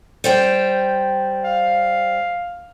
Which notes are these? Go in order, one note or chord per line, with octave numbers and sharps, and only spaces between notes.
G3 C5 G5
F5